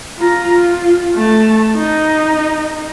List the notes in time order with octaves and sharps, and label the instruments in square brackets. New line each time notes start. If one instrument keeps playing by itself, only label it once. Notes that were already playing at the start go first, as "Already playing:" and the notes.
[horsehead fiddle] F4 A#5
F4
A3 A5
D#4